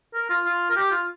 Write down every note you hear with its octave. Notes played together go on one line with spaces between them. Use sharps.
A#4
F4
F4
A#4
G4
F4